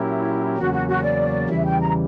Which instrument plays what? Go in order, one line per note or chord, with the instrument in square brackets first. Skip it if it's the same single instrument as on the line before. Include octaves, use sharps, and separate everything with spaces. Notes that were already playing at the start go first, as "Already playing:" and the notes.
Already playing: [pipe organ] A#2 F#3 C#4 G4 A#4 [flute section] E4
[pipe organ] E2 C#3 F#3 A#3 C#4 [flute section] F#4
[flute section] F#4
F#4
D5
[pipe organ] E2 C#3 E3 G3 [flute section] E5
[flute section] G5
A#5